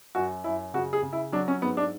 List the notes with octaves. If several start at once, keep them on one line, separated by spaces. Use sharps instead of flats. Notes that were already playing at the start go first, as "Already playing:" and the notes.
F#2 F#4
F#2 E4
C#3 F#4
G#4
C#3
E4
F#3 D4
C#4
G#2 B3
D4